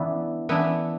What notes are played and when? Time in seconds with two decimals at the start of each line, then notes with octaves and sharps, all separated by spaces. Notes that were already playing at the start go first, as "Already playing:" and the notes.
Already playing: E3 B3 D4
0.49 E3 B3 D4